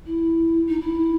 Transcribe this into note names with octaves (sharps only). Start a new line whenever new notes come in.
E4
D#4
E4